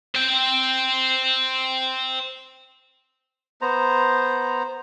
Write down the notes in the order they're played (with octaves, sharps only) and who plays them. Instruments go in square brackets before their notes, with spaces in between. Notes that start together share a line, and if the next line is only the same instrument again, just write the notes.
[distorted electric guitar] C5 G5
[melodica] B3 C5 A#5